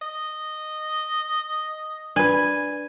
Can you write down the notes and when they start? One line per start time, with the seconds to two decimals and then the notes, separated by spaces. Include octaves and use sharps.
0.02 D#5
2.16 D4 B4 G#5